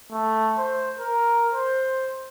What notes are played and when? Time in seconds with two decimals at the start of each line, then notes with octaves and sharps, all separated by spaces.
0.12 A3
0.58 C5
0.99 A#4
1.53 C5